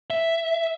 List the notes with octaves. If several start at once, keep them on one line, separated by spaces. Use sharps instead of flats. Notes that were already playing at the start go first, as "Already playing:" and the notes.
E5